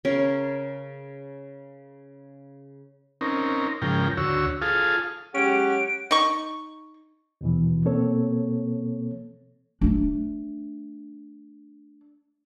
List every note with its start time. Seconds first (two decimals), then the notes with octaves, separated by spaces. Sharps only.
0.05 C#3 C#4 A#4
3.21 C4 C#4 D#4 A#4
3.82 G#2 C#3 F3 A#4 G5
4.17 D2 F#4 C#5 E6
4.62 F4 G#4 A4 F5 D#6
5.35 F#3 G#3 C#4 G4 F#5 D7
6.11 D#4 C#6
7.41 D#2 B2 E3
7.85 B2 A#3 C4 A4 C#5
9.81 A3 D4